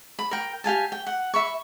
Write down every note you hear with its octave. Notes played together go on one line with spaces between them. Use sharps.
B5
A#4 G5
G4 F5 G#5 A5
G5
F#5
E5 B5 C#6